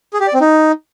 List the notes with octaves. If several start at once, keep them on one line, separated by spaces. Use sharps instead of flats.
G#4
G4
D5
C4
D#4